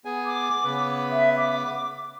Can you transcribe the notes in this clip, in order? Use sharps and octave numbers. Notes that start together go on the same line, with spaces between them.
B3 G#4 G#5
D6
C#3 B3 B4
E5
D6